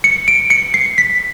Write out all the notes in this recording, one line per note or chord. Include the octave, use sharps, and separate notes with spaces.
C#7
D7
C#7
C7
B6